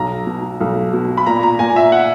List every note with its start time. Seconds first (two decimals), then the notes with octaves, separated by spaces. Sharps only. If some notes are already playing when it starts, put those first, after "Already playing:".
Already playing: B1 A#5
0.26 B2
0.60 B1
0.93 B2
1.17 B5
1.26 A#2 A#5
1.43 A#5
1.59 A#2 G#5
1.76 E5
1.92 F#5